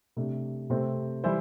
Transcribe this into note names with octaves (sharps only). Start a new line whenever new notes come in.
C3 A3 D4
C3 A3 C4 A4 C5
E3 G3 E4 C5